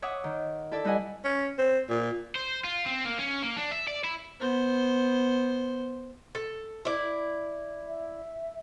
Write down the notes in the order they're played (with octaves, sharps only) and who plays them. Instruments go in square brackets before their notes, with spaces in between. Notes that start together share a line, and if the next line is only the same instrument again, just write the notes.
[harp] C#5 E5 F#5 D6 D#6
D#3
E4 A4 D5 E5
G3 E4 B4 D#5 F#5 G#5
[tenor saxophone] C#4
C4
A#2
[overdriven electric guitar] C5
F4
C4
A#3
C#4
A#3
D4
E5
D5
E4
[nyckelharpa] B3 C5
[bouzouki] A4
E4 D5
[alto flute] E5